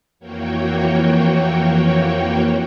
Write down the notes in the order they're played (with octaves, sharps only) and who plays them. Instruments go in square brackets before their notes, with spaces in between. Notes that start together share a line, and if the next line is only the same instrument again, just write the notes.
[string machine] F2 E3 A#3 F#4 C#5 G5